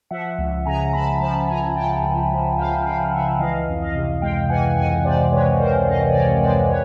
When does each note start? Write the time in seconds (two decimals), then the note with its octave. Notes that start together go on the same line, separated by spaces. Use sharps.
0.11 F3 E5 F#5
0.38 C#2
0.65 C#3 G#5 A#5
0.93 C#2 A5 B5
1.20 F3 A5 B5
1.48 C#2 G#5 A#5
1.76 C#3 G5 A5
2.03 C#2
2.31 F3
2.57 C#2 F5 G5
2.85 C#3 F5 G5
3.13 C#2 E5 F#5
3.40 E3 D#5 F5
3.68 F2
3.81 D#5 F5
3.95 C3
4.22 G#3 F5 G5
4.49 E3 F#5 G#5
4.77 F2 F#5 G#5
5.04 C3 C5 D5
5.32 G#3 B4 C#5
5.59 E3 A#4 C5
5.87 F2 D#5 F5
6.10 D5
6.15 C3 C#5 D#5
6.41 G#3 C5 D5
6.69 B4 C#5